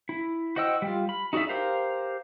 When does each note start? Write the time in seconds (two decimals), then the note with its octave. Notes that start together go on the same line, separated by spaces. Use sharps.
0.09 E4
0.56 F#4 C5 D#5 G5 E6
0.82 G3 F4
1.09 B5
1.33 D#4 F#4 G#4 D5 E5
1.49 G4 A#4 C5 F5 A#5